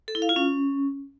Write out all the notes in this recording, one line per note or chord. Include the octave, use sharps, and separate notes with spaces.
A4
E4
F5
F4
C#4